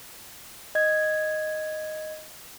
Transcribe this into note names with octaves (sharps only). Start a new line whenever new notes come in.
D#5 G#6